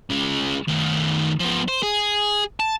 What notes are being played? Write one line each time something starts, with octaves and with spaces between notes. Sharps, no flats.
C#3 G#3
D#3 A3
F3 B3
C5
G#4
A5